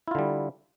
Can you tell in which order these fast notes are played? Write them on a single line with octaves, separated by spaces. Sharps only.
E4 F4 D3 G3